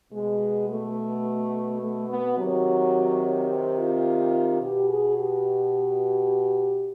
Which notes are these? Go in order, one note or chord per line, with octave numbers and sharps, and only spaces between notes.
B2 G#3
A3
A3
B3
C3 D#3 F#3
C4
F4
B2 G4
G#4
G4